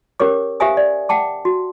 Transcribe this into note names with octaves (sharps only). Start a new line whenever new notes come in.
C#4 G4 A#4 C#5 D6
G4 C5 E5 F5 G#5 D#6
D5
F#5 G5 A5 D6
F#4